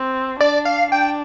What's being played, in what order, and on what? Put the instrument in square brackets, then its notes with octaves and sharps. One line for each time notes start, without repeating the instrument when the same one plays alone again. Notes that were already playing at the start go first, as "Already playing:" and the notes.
Already playing: [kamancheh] C4
[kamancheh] D4 [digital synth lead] D5
[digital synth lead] F5
[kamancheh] D4 [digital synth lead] G5